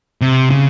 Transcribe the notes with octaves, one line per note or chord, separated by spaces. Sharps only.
C3
C#3